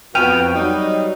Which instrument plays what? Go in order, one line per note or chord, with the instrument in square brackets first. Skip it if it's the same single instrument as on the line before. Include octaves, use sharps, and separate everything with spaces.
[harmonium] F2 F#4 [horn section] F3 B3 [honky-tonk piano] G5 [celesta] F6 D#7 F7
[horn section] F#3 D#4 [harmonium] G3